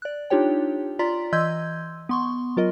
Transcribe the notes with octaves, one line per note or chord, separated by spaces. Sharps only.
D5 F#6
D4 D#4 F4 G4 C#5 G5
F4 D5 A#5 C6 B6
E3 D#5 C6 E6 G6 G#6
B3 C6 C#6
F#3 F4 A#4 D#5